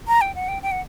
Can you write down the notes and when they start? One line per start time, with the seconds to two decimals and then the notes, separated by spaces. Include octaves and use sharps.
0.08 A#5
0.21 G5
0.35 F#5
0.48 G5
0.63 G5
0.71 F#5